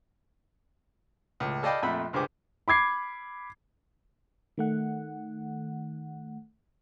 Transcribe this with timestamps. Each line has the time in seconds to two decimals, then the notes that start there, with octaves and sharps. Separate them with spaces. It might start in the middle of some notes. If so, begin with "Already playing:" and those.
1.40 C#2 A2
1.63 A4 D5 D#5 F5 G5 B5
1.82 A#1 F2 A3 E5 F#5 B5
2.13 C#2 G2 G#4 C5 D6
2.68 B5 D6 G#6 C7
4.58 D#3 A3 F#5